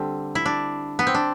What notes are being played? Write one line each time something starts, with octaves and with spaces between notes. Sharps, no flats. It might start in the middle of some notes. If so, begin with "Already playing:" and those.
Already playing: D3 G3 C4
E4
D4
B3
C4
D4